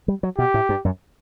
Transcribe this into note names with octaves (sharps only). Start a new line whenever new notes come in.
G3
F#3
B2 G4
A2
G2
F#2